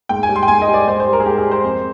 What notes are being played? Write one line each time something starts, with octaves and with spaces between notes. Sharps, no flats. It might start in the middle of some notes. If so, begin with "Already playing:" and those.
G#2 G5
G#5
G3
C6
G5
G#2 G#5
D#5
G3
D5
G#2 C5
C5
G3
A#4
G#4
G#2 G4
G#4
G3
C5
F2